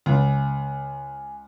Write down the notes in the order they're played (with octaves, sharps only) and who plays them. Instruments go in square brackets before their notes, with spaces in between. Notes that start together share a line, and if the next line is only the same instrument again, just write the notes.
[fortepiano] C#2 [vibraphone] G#5